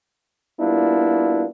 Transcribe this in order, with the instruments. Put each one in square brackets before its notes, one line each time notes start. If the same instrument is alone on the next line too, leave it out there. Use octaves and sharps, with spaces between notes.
[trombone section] G3 A#3 B3 D4 E4 F4